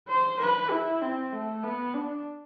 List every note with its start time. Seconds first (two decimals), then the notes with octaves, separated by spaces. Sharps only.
0.08 C5
0.40 B4
0.71 E4
1.01 C4
1.32 A3
1.63 B3
1.95 D4